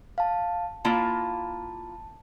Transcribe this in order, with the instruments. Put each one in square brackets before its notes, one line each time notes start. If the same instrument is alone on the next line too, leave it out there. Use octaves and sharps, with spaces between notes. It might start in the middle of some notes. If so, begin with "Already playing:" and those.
[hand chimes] F5 A5
[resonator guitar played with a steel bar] A#3 E4 F4 [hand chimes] A5